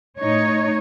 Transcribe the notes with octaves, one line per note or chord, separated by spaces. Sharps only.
A2 D#4 C#5